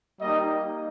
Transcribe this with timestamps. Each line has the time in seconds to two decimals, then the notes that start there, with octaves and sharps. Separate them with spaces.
0.21 G3 A#3 D#4 G4 D#5